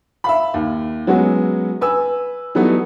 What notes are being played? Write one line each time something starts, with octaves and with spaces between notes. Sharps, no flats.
E5 F5 B5
D#2
F#3 G#3 B3 C#4 F#4
B4 G#5 E6
E3 F#3 G3 A3 B3 D#4